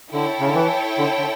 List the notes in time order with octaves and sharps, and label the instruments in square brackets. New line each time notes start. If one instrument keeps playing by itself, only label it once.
[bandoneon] D3 [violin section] E4 A4 C#5 G5
[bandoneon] C#3
D3
E3
D3
D3